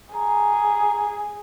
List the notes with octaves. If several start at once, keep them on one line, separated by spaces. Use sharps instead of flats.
G#4 A#5